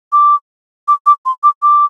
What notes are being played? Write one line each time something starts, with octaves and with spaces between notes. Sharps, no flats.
D6
D6
D6
C6
D6
D6